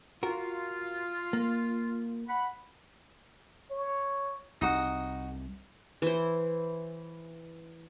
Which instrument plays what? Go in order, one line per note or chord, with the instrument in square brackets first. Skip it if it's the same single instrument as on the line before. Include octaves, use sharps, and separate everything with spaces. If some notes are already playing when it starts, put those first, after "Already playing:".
[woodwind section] F4 [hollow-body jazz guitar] F#4 A#4
[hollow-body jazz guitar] A#3
[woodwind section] F#5 B5
[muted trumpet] C#5
[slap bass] C2 [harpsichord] D#4 F#4
[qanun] E3 C5